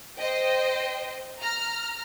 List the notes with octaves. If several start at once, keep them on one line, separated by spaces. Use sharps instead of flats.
C5 D#5 G5
A#5 F6